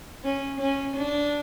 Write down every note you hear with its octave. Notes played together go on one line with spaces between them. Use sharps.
C#4
C#4
D4